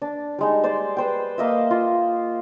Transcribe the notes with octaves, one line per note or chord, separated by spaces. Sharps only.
D4
G3 G#3 D#4
C5 D5
B4 C5 G5
A#3 D#5 E5
F4